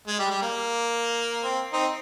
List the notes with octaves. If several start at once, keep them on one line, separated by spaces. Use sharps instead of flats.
G#3
G3
G3
A#3
C4
C4 D#4